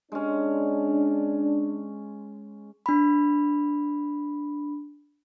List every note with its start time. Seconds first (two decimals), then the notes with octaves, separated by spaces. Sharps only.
0.12 G#3 C#4 D4
2.86 D4 B5